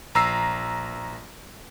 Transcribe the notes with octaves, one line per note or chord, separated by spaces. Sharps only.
A#1 A#5 E6 C7